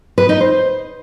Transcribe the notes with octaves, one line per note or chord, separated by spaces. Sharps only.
B4
D#4
C5